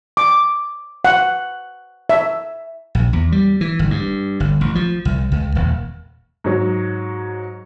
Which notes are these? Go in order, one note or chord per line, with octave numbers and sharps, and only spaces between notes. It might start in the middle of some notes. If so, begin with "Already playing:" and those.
D6
F#5
E5
A#1
E2
G3
E3
G1
G2
G1
A1
F3
C2
C#2
D#1
G#2 F#3